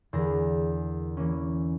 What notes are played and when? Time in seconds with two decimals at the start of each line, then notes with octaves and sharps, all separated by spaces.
0.13 E2 D3 D4 G#4 A#4 A#6
1.17 E3 A#3 C#4